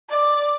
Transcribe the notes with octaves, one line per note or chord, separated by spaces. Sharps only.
D5